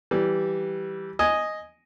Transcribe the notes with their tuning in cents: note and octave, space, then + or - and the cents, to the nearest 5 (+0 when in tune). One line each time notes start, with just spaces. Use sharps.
E3 +0 G3 -10
D#5 +0 G#5 +0